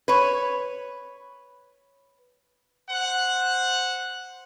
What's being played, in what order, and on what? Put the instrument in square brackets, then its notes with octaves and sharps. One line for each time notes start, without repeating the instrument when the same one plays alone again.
[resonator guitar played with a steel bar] B4 C#5
[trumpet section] C5 F#5